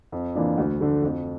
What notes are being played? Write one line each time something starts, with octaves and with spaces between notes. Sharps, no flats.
F2
E3 A#3 D4 F4
D2
D3 A3
F2